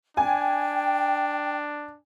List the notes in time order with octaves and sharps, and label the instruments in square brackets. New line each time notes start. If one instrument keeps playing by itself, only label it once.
[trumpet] D4 [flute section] G5 [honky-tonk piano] G#5